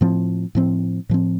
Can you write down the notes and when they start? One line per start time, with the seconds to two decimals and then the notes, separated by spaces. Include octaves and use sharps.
0.01 A2 F3 C4
0.55 A2 F3 C4
1.09 A2 F3 C4